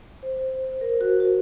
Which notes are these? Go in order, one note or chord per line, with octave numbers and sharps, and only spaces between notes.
C5
A#4
F#4
F#4